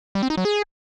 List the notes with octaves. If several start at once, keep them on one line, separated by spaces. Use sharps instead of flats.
G3
C4
D#4
F#3
G#4